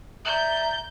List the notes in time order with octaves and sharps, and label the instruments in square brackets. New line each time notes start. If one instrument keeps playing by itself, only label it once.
[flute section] D5 E5 A#5 [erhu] G6